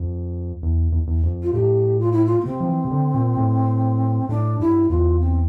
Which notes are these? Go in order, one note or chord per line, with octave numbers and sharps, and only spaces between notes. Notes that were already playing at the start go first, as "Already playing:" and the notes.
Already playing: F2
E2
E2
E2
F2
F4
A2 G4
F4
E4
F4
A#3
C3 C4
F3
E3
C3
D3
A#2
A2
A2 D4
G2 E4
E2 F4
C4